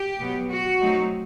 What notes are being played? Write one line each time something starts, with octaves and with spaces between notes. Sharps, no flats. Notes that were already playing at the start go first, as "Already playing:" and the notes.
Already playing: G4
B2 F#3 B3
F#4
F#3 A3 C4 D#4